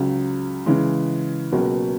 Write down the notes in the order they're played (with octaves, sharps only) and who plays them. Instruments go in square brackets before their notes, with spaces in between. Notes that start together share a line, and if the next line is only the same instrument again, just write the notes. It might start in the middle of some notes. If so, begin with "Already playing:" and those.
Already playing: [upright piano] C#2 C#3 F#3
C#3 E3 G#3
C#2 B2 F#3 A#3